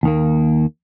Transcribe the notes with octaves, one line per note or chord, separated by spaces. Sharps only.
D#2 D#3 A#3